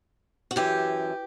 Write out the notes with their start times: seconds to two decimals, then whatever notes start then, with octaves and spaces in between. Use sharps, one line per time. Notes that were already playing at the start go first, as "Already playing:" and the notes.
0.51 F#4
0.56 F#2 E3 G4